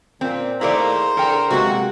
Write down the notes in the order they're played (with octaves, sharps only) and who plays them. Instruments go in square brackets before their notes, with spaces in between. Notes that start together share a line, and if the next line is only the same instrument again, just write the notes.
[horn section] A#2 [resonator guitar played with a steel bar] C4
[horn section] D#3 A3 A#3 [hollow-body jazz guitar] E4 G#4 D5 [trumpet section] C5 A#5
[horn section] D3 A#4 [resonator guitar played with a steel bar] A4 G5
[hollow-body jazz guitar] C3 G#3 A#3 [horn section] F#4